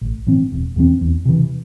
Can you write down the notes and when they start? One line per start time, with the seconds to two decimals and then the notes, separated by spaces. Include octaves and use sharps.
0.01 A1
0.27 A2 E3 C4
0.52 E1
0.76 E2 E3 C4
1.01 E2
1.25 C3 E3